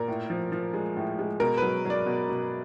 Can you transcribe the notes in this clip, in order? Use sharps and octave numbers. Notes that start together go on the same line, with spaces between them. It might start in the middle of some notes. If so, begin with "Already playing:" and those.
Already playing: A#2 A#4
A2
F3
F3
G#3
A2
G#3
B2 A#4
F#3 B4
F#3 D5
B2
B2